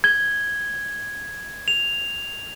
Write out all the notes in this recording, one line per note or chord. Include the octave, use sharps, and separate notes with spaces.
G#6 G7
F7